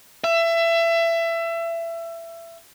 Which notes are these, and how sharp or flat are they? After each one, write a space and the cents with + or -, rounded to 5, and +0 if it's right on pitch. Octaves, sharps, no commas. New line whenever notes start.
E5 +25